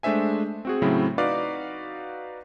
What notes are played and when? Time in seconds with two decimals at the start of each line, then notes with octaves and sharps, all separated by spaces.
0.03 G#3 A3 D4 C5 E5 G#5
0.65 C4 F#4 G#4
0.82 A2 C#3 F#3 A3 C4 E4
1.18 D#4 F#4 B4 D5 F5 D6